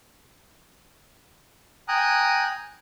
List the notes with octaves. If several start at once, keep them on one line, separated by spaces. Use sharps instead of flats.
G5 G#5 A#5 D#6 F#6